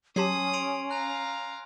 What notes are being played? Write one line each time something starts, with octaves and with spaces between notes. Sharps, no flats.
F#3 C#4 G4 A5 C6 D#6 G#6 C7
C6 D7 F7
F5 G#5 A#5 F#6